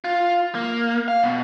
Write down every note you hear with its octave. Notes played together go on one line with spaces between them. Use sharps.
F4
A#3
F5
B2